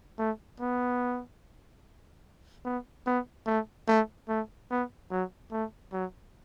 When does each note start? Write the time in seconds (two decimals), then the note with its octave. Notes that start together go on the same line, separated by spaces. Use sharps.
0.19 A3
0.60 B3
2.65 B3
3.06 B3
3.46 A3
3.88 A3
4.28 A3
4.71 B3
5.11 F#3
5.52 A3
5.93 F#3